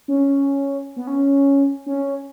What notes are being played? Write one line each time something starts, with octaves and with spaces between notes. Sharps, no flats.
C#4
B3
C#4
C#4